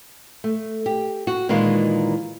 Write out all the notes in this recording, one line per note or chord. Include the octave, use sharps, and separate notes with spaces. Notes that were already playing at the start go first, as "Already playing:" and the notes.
A3
G4
F#4
A#2 D#3 E3 G#3 F4